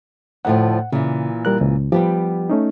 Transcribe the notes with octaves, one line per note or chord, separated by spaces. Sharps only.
D2 A2 F3 F#5
A#2 C#3 E3
G3 A#4 F#6
C#2
F3 G3 B3 G4
A3 C#4 D#4